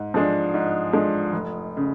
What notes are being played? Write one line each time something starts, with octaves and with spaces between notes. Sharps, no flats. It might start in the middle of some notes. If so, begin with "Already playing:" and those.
Already playing: G#2
F3 G#3 D4
G#2
F3 G#3 D4
F1
C#3